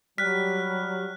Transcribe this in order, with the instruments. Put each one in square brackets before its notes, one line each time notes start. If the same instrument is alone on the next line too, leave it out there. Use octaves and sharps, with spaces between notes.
[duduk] F#3 [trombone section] G3 [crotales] F6 F#6 [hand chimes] B6